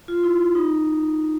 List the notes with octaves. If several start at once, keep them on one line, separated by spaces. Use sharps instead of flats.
F4
E4
D#4